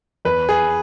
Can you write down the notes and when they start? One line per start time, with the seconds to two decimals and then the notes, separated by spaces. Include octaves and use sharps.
0.25 E2 B4
0.49 G#4